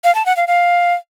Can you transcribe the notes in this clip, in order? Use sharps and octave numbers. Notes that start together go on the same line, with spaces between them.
F5
A5
F#5
F5
F5